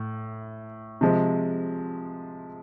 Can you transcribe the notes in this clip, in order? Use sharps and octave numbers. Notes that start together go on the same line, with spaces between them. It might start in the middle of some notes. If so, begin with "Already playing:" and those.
Already playing: A2
C3 F3 G#3